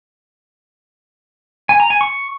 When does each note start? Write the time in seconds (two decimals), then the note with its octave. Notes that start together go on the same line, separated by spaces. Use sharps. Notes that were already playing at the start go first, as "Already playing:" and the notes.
1.69 G#5
1.80 A#5
1.90 G#5
2.01 C#6